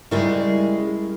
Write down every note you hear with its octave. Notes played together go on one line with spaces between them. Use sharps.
C#3 G3 G#3 E4 A#4